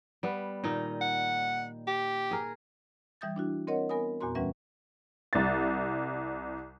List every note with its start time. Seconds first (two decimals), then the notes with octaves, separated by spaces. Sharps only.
0.23 G3 B3
0.64 A#2 D#3 D#4
1.01 F#5
1.87 G4
2.31 G#4 A#4
3.21 E3 G3 E5 D#6 G6 A6
3.36 D4 E4 F#4
3.67 C4 A#4 C#5 D#5 F#5
3.89 B3 A#4 G#5 B5 D#6
4.21 E2 A#2 B3 F#4 A#5 C6
4.35 D2 E3 G3 C#4 B4 E5
5.33 C2 A6